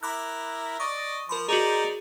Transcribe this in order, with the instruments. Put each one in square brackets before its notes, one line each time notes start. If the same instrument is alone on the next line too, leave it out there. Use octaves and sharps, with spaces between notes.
[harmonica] E4 A#4 [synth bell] B5 D6 F#6
[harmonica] D5 D#5 [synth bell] C#6
[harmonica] F3 [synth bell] A#4 B5 C6
[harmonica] D#4 C5 D5 [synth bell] F#4 G#4 [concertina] A#5